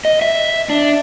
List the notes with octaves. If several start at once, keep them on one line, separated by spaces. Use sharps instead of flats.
D#5
E5
D4